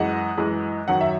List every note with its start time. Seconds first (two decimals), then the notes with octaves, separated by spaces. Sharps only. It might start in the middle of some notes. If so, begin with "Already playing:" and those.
Already playing: F#2 E3 G#3 D#5 F#5
0.37 F#2 E3 G#3
0.88 F#2 D#3 F#3 F#5
1.01 E5